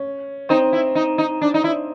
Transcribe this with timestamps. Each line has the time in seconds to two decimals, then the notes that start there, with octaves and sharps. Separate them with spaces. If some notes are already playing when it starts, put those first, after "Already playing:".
Already playing: C#4
0.49 C4 D#4
0.73 E4
0.95 D#4
1.18 D#4
1.42 D4
1.54 D#4
1.64 E4